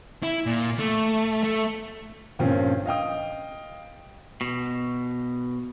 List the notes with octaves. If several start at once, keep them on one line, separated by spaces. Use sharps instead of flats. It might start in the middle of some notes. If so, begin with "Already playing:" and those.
E4
A#2
A3
A3
G2 A#2 F3 C4 C#4
D#5 F5 G5 D#6
B2